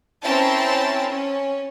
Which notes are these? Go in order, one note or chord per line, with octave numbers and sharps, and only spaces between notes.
C4 C#4 E4 A#4 G5 A5
C#4